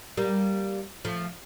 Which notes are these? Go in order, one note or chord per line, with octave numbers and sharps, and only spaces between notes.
G3 A#3
F3 A3